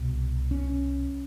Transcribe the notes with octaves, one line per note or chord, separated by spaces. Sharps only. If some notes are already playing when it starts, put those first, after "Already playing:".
Already playing: C2 B2
C#4